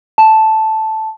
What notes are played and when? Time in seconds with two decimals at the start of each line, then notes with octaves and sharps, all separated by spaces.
0.18 A5